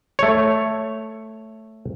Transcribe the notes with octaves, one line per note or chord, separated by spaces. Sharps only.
A3 C#5